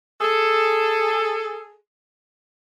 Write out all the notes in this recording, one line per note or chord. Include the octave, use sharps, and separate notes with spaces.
G#4 A4